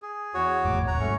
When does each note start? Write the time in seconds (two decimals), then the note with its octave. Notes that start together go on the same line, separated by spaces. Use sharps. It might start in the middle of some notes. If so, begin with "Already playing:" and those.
0.02 G#4
0.34 E2 F#4 C#5
0.64 G#1 F2 A2 D6
0.87 D#1 A1 D#2 C#5 F#5 A#5
0.99 G#2 C3 F#3 A3 C#4 C#6